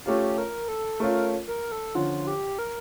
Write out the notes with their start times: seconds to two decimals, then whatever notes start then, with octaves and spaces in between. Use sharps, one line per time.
0.06 A3 C#4 F4 G4
0.38 A#4
0.68 A4
1.00 A3 C#4 F4 A#4
1.48 A#4
1.72 A4
1.95 D3 F3 C#4 F4
2.27 G4
2.59 A#4